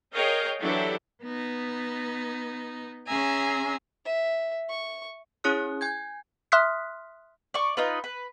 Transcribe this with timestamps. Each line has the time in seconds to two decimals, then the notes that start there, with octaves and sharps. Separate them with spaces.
0.14 G#4 A#4 C#5 D#5 F5 G5
0.61 E3 F#3 D4 E4 G4 A4
1.22 B3 D#4
3.07 C#4 G#4 E5 G#5 A#5
4.05 E5
4.70 C#6
5.44 C#4 E4 G#4 C#5 D#6 F#6
5.81 G#5 G6 G#6
6.52 E5 C6 D#6 F6 F#6 B6
7.54 D5 C#6
7.77 D#4 F4 B4
8.04 B4